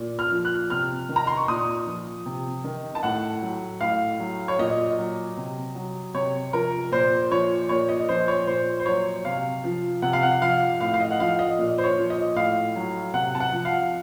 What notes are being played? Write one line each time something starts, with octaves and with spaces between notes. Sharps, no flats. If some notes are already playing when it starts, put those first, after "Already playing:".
Already playing: A#2
F6
F3
F#6
C3 F6
D#3
A#5
C6
C#6
A#2 D#6
F3
C3
D#3
A5
A2 F#5
F#3
A2 F5
F#3
C#5
A#2 D#5
F#3
C3
F#3
C3 C#5
F3 A#4
A#2 C5
F3 C#5
A#2 C#5
D#5
F3 C5
C#5
A#2 C5
C5
F#3 C#5
C3 F5
F3
C3 F#5
F5
F#5
F3 F5
A2 F5
F5
D#5
F#5
F3 F5
D#5
A#2
C5
C#5
F3
D#5
A2 F5
F#3
C3 F#5
A5
F#5
F3
F5